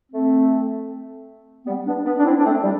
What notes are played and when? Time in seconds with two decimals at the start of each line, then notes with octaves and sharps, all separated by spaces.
0.13 A3 C4
1.67 G3 B3
1.87 B3 D4
2.06 B3 D4
2.19 D4
2.25 C4 E4
2.37 D4
2.45 A3 C4
2.64 G3